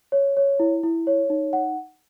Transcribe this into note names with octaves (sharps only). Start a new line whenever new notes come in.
C#5
C#5
E4
E4
C#5
D#4
F#5